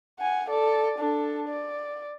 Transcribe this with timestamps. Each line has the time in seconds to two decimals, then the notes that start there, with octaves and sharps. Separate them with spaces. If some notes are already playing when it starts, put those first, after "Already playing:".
0.19 F#5 G#5
0.50 A4 D5
0.99 D4 A4
1.48 D5